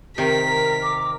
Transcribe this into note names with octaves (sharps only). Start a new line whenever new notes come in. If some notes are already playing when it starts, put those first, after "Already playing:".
C3 D#3 A#4 B6
D6